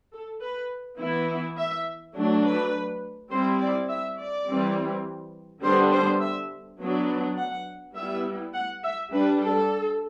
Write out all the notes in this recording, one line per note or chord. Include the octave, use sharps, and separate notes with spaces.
A4
B4
E3 B3 E4
E5
F#3 A3 D4
B4
G3 C4 E4 C5
D5
E5
D5
E3 G3 C4
D3 G3 B3 D4 C5
C5
E5
F#3 B3 D4
F#5
G3 B3 E4 E5
F#5
E5
G3 D4 B4
A4